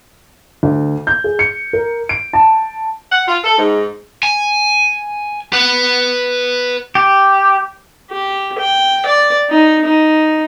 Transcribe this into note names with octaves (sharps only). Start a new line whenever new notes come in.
D2
G6
G#4
C#7
A#4
D7
A5
F#5
F4
A4
G#2
G#5
B4 F#5
G4
G4
G5
D5
D#4
D#4